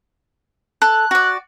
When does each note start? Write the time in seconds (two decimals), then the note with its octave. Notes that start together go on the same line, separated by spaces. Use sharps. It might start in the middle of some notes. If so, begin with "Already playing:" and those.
0.82 A4 F#6
1.11 F#4 D5